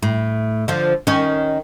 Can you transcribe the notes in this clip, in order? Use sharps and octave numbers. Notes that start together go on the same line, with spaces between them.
A2
D3 F3
D#3 C#4